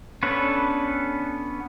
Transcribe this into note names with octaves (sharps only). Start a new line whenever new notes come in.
B3 C#4 D4 A4 B4